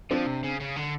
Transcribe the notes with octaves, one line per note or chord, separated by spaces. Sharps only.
F3 C4 D4
C3
C#3
C#3
D3